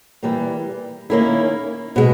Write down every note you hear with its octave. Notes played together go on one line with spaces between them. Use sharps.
E3 G3 A#3
D#3 A#3 C#4 E4
B2 G#3